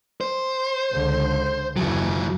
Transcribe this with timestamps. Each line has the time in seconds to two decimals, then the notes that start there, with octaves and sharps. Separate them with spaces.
0.21 C5
0.92 C#2 D3
1.77 F#1 D#2 E3 F#3